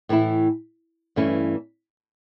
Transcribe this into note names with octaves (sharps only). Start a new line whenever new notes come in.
A2 E3 A3 E4
G2 E3 A3 C#4 E4